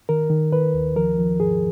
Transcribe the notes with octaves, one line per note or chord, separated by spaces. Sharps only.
D#3 A#4
D#3
D#3 B4
D#2
F3 A#4
F3
G#2 G#4